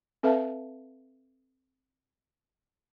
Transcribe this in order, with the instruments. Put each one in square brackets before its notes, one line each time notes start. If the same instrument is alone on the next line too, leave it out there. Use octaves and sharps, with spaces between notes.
[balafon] C4 A4 B4 E5 F5 A5